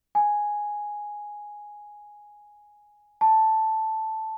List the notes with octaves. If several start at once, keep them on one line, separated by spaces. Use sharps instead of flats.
G#5
A5